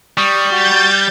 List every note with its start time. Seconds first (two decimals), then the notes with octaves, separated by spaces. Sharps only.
0.18 G3 C#6 D#6
0.51 F#4 G6 A6